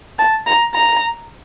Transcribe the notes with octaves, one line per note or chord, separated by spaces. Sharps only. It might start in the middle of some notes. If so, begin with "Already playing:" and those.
A5
A#5
A#5